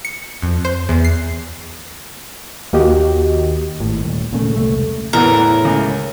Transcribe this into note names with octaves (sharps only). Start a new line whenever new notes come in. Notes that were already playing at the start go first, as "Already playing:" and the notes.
C#7
F2
C5
E2
C7
D#2 A#3 F#4 G4 D#5
G#1 A2
D#1
A#2 C#3 A3
E1 C2 A3
E2 A2 E3 B3 A#4
C#2